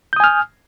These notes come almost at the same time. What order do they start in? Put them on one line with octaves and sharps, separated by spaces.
G6 D#6 G#5 F6